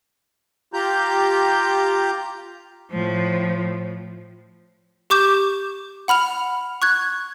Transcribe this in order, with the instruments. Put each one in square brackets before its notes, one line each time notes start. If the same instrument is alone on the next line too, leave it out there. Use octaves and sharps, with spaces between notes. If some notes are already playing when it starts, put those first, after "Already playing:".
[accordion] F4 G4 A#5 G6
[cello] A2 F3
[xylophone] G4 C#6 D6 G6 E7
F#5 B5 F6 F7
C#6 F#6 G#6